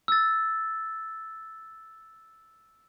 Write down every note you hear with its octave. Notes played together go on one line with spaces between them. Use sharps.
E6 A6